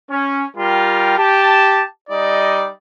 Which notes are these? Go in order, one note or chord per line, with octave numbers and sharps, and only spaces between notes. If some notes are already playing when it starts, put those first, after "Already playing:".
C#4
G3 F4 A#4 G5
G4 A5
G3 D#4 D5 D#5